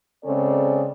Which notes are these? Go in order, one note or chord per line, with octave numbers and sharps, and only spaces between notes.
C#3 G#3 C4 C#4 A4 D5